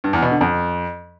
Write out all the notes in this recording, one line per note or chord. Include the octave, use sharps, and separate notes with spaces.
G2
E2
B2
D3
F2